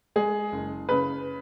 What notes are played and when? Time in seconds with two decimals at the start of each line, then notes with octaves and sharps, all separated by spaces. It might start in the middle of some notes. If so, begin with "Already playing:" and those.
0.16 G#3 G#4
0.52 F#1
0.89 C#3 B4